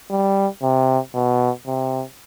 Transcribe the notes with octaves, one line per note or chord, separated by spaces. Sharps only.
G3
C3
B2
C3